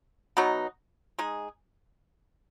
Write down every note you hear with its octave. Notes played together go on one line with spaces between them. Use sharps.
B2 F#3 B3 D#4
G#3 D#4 G#4